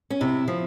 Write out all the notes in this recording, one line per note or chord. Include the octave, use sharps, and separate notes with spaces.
C#4
C3 E4
F3